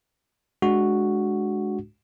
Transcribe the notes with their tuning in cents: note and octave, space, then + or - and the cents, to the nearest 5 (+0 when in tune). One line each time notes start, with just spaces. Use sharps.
G#3 +15 D4 +0 F#4 +0